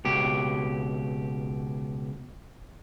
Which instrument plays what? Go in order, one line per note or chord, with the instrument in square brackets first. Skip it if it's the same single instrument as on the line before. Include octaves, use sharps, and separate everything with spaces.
[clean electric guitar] C#2 B2 G4